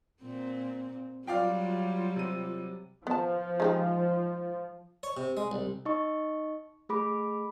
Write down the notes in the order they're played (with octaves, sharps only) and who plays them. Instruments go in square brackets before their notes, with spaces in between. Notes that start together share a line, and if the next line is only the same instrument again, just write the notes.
[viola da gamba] A#2 C4
[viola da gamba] F#3 G3 [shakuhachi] F4 [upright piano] D5 F5 G5
[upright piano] C3 D#7
[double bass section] F3 [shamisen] B3 A5
[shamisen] G#3 D#4 G4
[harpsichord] C#5
C3
G#3
C2
[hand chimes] D#4 D#5 C#6
A3 G#4 B5 D6